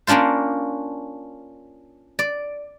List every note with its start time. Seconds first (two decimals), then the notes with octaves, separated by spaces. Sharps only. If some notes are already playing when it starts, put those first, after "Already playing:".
0.07 A#3 C#4 D4 F4 C5
2.19 D5